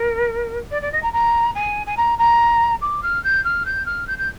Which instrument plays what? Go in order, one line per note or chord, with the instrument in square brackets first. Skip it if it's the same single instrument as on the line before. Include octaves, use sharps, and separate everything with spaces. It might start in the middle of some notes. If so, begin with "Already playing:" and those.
Already playing: [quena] A#4
D5
D5
D#5
A#5
A#5
G#5
G#5
A#5
A#5
D6
F6
G6
F6
G6
F6
G6
G6